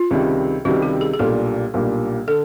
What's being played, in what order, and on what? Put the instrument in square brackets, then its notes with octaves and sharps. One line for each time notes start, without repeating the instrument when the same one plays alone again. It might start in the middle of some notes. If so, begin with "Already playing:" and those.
Already playing: [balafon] F4
[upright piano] C#2 C3 D#3 G3
[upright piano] C#2 C3 D#3 G3 [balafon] F#4
[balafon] G4
G#4
G#4
[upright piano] B1 A#2 G3 A#3 D4 [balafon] A4
[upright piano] B1 A#2 G3 A#3 D4
[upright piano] D3 [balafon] A4